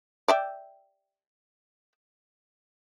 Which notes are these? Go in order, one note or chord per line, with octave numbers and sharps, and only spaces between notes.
D5 E5 G5